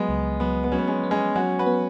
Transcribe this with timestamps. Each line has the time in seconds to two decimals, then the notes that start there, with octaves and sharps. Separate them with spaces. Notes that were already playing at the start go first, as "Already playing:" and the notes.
Already playing: F#3 G#3 B3
0.09 C#2
0.40 F#3 B3
0.64 B3
0.72 F#3 C#4
0.78 B3
0.87 G#3 C#4
1.04 B3
1.11 G#3 C#4
1.36 F#3 C#4 F#4
1.59 F#4 B4
1.66 B3